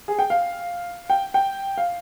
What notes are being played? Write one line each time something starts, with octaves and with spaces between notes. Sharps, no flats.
G#4
G5
F5
G5
G5
F5